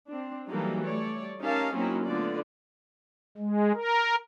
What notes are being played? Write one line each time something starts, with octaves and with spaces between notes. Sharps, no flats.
C4 D4
E3 F#3 G3 A#3 D#4 A4
G3 A3 C#5 D5
C#4 D#4 G4 A#4 F5 A5
F#3 A#3 C4 C#4 D#4 E4
D3 A3 B3 F4 D5
G#3
A#4